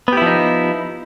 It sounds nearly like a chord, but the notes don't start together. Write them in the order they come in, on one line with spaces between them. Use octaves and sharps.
B3 G4 E4 F3 D#4